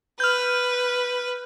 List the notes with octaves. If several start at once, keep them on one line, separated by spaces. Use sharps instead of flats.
B4 F6 G6